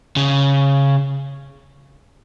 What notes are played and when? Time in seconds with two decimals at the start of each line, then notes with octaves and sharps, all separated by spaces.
0.16 C#3